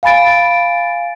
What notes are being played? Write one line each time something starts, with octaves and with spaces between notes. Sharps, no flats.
F5 G#5 B5 A6 D7